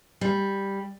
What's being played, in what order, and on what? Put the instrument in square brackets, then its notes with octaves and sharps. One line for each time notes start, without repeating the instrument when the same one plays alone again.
[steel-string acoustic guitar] G3